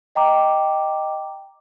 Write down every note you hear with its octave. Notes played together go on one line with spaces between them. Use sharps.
D#5 G5 A#5 D6